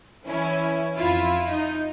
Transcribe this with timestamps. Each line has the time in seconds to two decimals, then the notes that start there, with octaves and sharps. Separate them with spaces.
0.25 E3 C#4 E4
0.96 F2 E4 F4
1.49 D#4